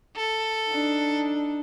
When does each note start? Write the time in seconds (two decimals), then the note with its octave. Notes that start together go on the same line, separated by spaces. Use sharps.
0.16 A4
0.68 D4 D#4